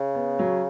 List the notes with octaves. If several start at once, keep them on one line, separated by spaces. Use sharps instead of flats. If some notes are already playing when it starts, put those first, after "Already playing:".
Already playing: C#3
B3
F#3